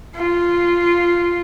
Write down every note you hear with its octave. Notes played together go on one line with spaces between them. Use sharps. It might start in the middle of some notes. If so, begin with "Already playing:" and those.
F4